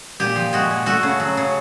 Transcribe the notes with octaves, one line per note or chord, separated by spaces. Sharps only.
A#2 G4
F3
G#3 F#4
A#2
A3 F#4
C#3
F#3
C#3